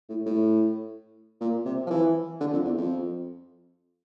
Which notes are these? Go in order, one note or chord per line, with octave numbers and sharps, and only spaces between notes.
A2
A2
A#2
C3
F3
E3
D3
F2
E2
F2